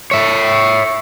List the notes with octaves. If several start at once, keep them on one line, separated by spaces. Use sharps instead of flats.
C#5 E5